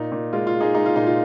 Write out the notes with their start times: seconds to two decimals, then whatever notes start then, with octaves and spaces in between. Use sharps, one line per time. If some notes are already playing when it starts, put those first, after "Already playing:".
Already playing: A#2 D#4
0.12 A#2
0.33 G#3 F4
0.47 F4
0.54 G#3
0.60 D#4 G#4
0.75 G#3 D#4
0.86 F4
0.96 A#2 D#4
1.07 F4